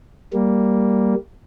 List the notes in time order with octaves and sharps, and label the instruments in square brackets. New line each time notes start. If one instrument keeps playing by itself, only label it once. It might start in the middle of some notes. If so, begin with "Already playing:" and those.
[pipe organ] G3 A#3